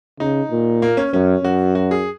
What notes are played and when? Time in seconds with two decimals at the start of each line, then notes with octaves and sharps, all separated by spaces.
0.20 C#3 D#4
0.51 A#2
0.82 A#3
0.97 C#4
1.13 F#2 C#4
1.44 F#2 F#4
1.75 F#4
1.91 G#4